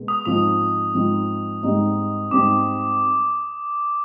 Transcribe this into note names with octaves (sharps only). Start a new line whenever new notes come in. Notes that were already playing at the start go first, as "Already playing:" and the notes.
Already playing: B2 G#3
D#6
G#2 F3 C4 D#4 D#6
G#2 F3 C4 D#4
G#2 G3 C4 D#4
G#2 G3 C4 D#4 D6